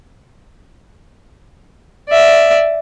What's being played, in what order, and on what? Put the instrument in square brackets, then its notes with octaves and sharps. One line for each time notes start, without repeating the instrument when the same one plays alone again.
[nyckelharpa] D5 E5